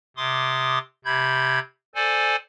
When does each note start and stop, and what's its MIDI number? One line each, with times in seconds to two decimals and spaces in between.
0.17 0.79 48
0.17 0.79 84
0.17 0.79 86
0.17 0.79 87
1.05 1.59 48
1.05 1.59 83
1.05 1.59 91
1.05 1.59 92
1.95 2.36 69
1.95 2.36 72
1.95 2.36 74
1.95 2.36 80